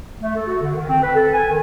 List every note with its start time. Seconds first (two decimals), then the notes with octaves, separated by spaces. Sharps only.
0.22 A3
0.36 A4
0.47 F#4
0.62 D3
0.75 D#3
0.89 C4
1.03 B4
1.16 A4
1.33 G#5
1.49 D#3